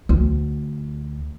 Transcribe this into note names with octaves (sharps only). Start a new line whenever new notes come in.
D2